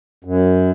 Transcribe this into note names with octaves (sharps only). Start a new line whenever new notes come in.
F#2